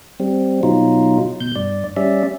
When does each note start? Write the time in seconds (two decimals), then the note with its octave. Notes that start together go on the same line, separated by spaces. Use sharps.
0.20 G3 C4
0.63 B2 F#3 D#4 F4
1.41 B2 G6
1.56 G2 D5
1.97 G3 C#4 D5 E5